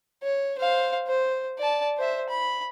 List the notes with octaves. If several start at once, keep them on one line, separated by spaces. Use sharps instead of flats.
C#5
C5 F5
C5
D5 A5
C5 E5
B5